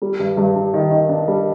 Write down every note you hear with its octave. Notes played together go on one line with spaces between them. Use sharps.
G3
G2
G2
G2
D#3
D#3
D4
G3